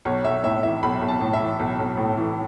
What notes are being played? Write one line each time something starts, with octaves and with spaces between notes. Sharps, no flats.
B1 C#5
B1 E5
A2 E5
E3 E5
B1 B5
B1
A5
A2
E5
E3
B1
B1
A2
E3